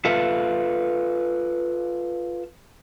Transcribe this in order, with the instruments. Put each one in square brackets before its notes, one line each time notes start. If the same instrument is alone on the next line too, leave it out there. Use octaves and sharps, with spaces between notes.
[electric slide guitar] F4 A4 B4 E5 F5